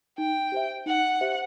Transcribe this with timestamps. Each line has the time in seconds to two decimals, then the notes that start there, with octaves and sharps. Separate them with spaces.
0.18 D#4 G5
0.52 G4 C5 E5
0.86 D#4 F#5
1.21 G4 C5 E5